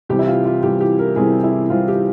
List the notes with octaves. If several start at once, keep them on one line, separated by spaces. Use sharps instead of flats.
C2 C3 E3 G3 G4
E4
F4
F4
C2 C3 E3 G3 G4
G4
A#4
C2 C3 E3 G3 G#4
E4
C2 C3 E3 G3 F4
G4